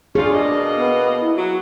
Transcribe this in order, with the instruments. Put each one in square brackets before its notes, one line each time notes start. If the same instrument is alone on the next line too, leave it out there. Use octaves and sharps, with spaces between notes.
[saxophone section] F#2 C#4 F4 [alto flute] D4 [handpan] G#4
[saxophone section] B2 A#3 D#5
[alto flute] B3
E4
[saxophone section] F#3 [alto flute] F#4